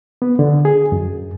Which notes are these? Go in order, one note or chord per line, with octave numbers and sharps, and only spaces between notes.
B3
D3
G#4
F#2